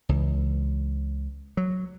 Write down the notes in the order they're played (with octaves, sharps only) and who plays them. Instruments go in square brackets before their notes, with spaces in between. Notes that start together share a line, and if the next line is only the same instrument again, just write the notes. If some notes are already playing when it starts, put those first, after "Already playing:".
[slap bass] C#2 E3
F#3